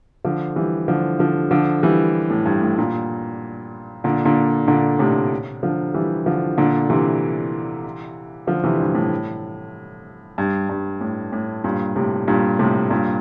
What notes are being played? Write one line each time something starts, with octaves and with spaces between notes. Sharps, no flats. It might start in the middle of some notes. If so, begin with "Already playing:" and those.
D3 F3
E3 G3
D3 F3
D3 F3
D3 F3
E3 G3
A2
G2
A2
G2 A#2
A#2 D3
A#2 D3
A#2 D3
A2 C3
D3 F3
E3 G3
D3 F3
A#2 D3
C3 E3
D3 F3
C3 E3
G2
A2
G2
G2
A2
A2
G2 A#2
A2 C3
G2 A#2
A2 C3
G2 A#2